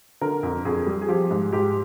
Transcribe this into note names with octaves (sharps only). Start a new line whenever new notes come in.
D3 A#4
F2
F2 G#4
G3
G#4
F3 G4
G#2
G#2 G4